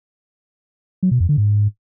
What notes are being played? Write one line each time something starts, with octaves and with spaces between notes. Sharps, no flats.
F#3
B2
F2
D3
G#2